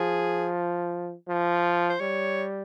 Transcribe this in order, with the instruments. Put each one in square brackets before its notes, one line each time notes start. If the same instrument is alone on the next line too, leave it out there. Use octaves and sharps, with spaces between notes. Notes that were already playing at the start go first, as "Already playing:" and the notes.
Already playing: [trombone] F3 [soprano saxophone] G#4
[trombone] F3
[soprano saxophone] C5
[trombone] G3 [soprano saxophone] C#5